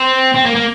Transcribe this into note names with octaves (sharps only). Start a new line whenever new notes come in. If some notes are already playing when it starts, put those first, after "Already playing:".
Already playing: C4
C4
A#3
A#3